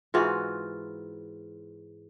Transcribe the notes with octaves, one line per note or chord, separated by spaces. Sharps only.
G#2 E3 F4 F#4